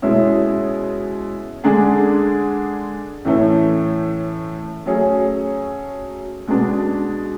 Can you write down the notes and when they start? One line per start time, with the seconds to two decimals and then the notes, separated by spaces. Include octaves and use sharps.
0.02 B2 G#3 C#4 E4
1.64 D3 G#3 D4 G#4
3.25 A2 E3 A3 C#4
4.86 F#3 A3 C#4 G#4
6.47 B2 G#3 B3 D4